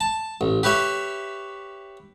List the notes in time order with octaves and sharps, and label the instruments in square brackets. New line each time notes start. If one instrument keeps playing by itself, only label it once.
[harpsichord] A5
A1
G4 B4 C#5 E5